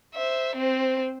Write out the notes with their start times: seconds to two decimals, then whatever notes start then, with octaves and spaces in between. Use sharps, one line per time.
0.15 C5 E5
0.55 C4 C5